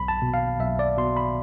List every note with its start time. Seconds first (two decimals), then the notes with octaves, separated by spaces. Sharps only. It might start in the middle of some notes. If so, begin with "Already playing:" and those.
Already playing: B1 B5
0.08 A5
0.22 B2
0.34 F5
0.60 B1 E5
0.79 D5
0.97 B2 C6
1.17 B5